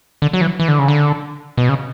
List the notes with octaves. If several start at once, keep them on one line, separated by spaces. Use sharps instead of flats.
D3
F#3
E3
E3
D3
C#3
D3
B2
C#3